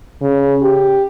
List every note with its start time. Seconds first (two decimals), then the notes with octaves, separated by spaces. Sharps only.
0.21 C#3
0.62 G4